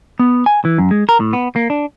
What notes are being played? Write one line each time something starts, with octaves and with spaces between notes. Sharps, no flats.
B3
G#5
E3
F#2
G#3
A#4
A2
B3
A#3
D4